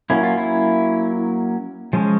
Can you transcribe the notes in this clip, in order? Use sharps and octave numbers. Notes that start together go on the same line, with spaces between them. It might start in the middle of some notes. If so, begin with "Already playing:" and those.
F#3 A#3 C#4 E4
F4
E4
F3 G#3 C#4